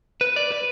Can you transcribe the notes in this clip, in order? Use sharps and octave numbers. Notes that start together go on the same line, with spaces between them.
B4
D5
B4